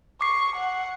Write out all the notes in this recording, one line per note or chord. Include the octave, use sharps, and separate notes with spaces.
C#6 D6 C7
F#5